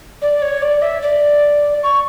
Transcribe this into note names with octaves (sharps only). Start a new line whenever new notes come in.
D5
C#5
D5
E5
D5
C#6